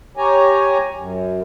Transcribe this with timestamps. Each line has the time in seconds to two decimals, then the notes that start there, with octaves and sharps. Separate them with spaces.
0.17 G4 C#5 G#5 A#5
0.96 F#2